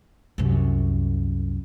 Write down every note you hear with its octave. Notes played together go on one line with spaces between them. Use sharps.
C2 F#2